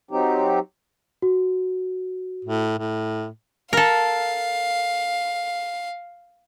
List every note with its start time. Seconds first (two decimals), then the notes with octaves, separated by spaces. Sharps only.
0.11 F#3 C4 D#4 G4
1.22 F#4
2.45 A2
2.78 A2
3.73 A4 A#4 F5